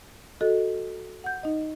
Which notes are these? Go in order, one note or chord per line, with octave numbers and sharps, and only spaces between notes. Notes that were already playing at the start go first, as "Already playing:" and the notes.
F#4 A4 D#5
F#5 G6
D#4 D#5